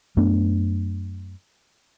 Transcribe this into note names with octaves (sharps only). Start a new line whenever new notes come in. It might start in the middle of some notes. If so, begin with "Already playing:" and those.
F#2 A3 B3 D4